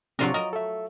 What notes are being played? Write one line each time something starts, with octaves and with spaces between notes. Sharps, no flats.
C3 F#3 D4 F4 A#4 C#6
A#4 D#5
A4 E5